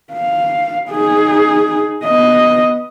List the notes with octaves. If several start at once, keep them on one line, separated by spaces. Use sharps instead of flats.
F5
D#4 G#4
B3 D#5